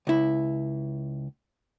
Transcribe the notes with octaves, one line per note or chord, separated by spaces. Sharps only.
C#2 E4